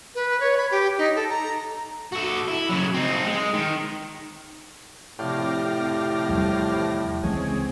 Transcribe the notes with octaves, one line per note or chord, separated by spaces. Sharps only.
B4
C#5
B5
G4
D#4
A4
A#5
F#4 A4
E4
C#3 F#3
C4 D#4
G#3
D#3
F2 A2 C3 G4 D5 F5 A#6
E2 G3
C#2 E3 G#3 C4 C#4 G#4